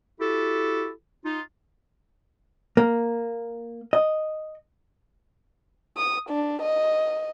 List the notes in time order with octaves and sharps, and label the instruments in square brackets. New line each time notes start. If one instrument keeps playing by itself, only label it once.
[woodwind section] E4 F#4 G4 A4
D#4 F4
[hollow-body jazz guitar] A#3
D#5
[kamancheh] D#6
D4
D#5